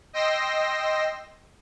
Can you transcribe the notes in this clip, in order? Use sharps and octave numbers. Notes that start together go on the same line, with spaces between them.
D#5 G5 C6 E6 A#6